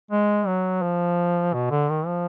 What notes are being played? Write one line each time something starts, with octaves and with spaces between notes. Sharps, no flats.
G#3
F#3
F3
B2
D3
D#3
F3